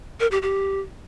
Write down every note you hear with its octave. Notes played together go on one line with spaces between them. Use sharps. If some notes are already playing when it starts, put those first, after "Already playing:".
A#4
G4
G4